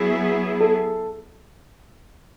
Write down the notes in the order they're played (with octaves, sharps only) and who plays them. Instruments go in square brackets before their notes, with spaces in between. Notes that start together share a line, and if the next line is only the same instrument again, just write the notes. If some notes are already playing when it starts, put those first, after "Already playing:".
Already playing: [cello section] F#3 B3 E4 G#4
[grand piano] A4